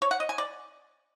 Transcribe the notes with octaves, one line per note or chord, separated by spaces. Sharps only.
C#5
F#5
D#5
G#5
D5